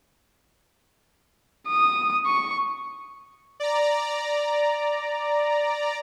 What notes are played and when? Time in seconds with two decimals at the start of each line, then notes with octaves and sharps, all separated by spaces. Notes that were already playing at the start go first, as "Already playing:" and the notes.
1.68 D#6
2.26 C#6
3.60 D5 A#5